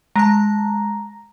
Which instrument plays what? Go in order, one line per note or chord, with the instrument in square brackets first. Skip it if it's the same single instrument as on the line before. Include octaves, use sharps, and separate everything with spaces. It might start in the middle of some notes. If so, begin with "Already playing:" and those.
[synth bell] G#3 A5 [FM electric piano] A#5